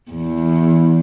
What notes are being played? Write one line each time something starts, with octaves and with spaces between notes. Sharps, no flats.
E2